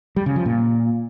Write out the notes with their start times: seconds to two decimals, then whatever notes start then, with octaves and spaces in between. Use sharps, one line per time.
0.16 G3
0.26 C#3
0.36 F3
0.46 A#2